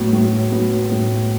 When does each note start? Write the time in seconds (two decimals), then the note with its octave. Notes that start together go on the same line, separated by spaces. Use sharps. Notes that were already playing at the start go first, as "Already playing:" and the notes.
Already playing: A2 F#3 B3
0.13 A2
0.52 F#3 B3
0.92 A2